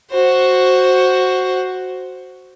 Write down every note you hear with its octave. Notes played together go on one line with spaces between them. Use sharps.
F#4 C5